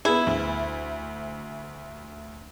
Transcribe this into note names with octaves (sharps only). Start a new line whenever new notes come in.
B3 E4 G#4
D2